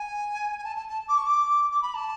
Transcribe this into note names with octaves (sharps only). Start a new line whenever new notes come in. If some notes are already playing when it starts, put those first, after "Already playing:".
Already playing: G#5
G#5
A5
A5
A5
D6
C#6
D6
D6
B5
A5